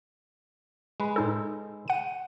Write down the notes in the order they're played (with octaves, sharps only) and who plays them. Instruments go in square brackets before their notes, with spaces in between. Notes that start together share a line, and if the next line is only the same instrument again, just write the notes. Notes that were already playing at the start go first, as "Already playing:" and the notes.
[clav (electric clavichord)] G#3 B4
[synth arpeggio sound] A2 D#4 A4
F#5 D#7